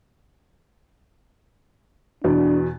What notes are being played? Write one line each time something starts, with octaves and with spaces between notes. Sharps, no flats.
E2 B2 D4